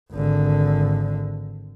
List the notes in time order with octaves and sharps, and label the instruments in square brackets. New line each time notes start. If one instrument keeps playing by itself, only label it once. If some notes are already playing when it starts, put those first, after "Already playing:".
[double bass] G#1 D3